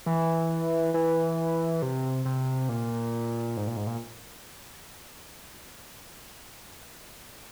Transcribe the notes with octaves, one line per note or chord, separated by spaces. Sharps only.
E3
E3
C3
C3
A#2
G#2
A#2
G#2
A#2